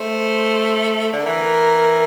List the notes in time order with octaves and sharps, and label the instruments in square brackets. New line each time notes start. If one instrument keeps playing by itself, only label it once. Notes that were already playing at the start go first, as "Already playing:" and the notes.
Already playing: [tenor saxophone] A3 [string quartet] C5
[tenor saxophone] D3
[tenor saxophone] E3 [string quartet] A#4